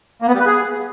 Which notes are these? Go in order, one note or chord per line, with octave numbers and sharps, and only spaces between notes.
A#3
B3
G3
B4
G#4